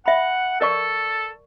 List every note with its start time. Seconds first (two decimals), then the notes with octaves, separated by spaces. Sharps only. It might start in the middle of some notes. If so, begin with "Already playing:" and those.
0.06 E5 F#5 B5
0.61 A4 A#4 D5 C#6